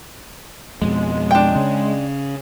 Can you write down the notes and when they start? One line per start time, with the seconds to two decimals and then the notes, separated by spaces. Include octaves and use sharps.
0.82 F2 B2 G#3
1.31 D4 G5
1.56 C#3 C#4